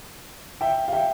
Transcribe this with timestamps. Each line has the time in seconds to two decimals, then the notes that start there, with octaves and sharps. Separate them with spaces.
0.61 E5 G5
0.88 F5
0.92 E5 G5